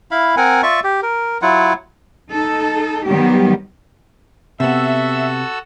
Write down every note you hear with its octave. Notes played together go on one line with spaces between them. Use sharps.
E4 F5 B5
C4 A#4 F#5 G#5
F4 D5 E5 C#6
G4
A#4
F#3 E4 F4 F#5
D#4 A4
D#3 F#3 G3 B3 G4
C3 B3 F#4 A4 E5 E6